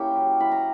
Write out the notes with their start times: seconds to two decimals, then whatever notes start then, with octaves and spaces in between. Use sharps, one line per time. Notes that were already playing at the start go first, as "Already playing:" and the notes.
Already playing: A#3 C#4 E4 G4 C#5 G5
0.16 F#3
0.40 E4 B5
0.52 A#5